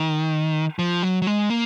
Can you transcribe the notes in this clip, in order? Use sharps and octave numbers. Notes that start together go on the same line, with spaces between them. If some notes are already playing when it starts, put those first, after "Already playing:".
Already playing: D#3
F3
F#3
F#3
G#3
A#3